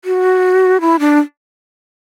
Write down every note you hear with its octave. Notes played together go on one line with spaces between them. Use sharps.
F#4
E4
D4